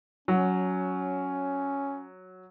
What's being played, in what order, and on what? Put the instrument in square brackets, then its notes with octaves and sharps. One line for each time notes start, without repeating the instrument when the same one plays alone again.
[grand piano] F#3 [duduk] C#4